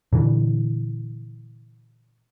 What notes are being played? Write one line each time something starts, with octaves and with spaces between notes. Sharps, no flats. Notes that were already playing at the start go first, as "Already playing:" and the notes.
A#2 D3 E3